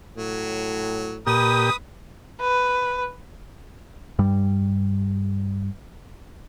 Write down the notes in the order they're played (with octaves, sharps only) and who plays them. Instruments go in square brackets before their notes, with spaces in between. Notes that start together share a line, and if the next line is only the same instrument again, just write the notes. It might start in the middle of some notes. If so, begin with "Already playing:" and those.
[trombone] A2 [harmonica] F#3
[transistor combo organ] A#2 G4 [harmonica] B4 [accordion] D#6
[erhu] B4
[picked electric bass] G2 G3